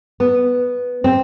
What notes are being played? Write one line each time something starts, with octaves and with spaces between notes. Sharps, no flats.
B3
C4